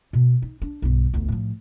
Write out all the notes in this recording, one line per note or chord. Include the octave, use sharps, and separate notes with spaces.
B2
D#4
D4
B1 G2
G1 D2
A2 F3